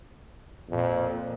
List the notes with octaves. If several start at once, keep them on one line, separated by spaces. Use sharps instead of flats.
F2 A#2